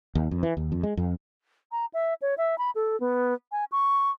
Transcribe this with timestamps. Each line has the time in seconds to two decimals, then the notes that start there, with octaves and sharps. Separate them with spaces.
0.15 D#2
0.31 F2
0.43 E3
0.57 D#2
0.72 F2
0.83 G#3
0.97 F2
1.72 A#5
1.94 E5
2.22 C#5
2.38 E5
2.58 B5
2.75 A4
3.00 B3
3.52 G#5
3.72 C#6